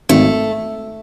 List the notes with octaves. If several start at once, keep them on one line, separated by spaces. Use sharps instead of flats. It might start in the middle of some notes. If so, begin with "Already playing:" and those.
G#1 A3